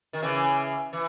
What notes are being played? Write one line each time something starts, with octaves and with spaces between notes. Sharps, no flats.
D#3
C#3 E3
E3